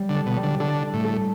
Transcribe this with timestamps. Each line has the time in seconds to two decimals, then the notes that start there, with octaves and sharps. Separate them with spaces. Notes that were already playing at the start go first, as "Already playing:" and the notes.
Already playing: G3
0.09 D3
0.15 A4
0.26 B2
0.37 G3
0.43 D3
0.60 D3 A4
0.82 D4
0.94 A2
1.04 A4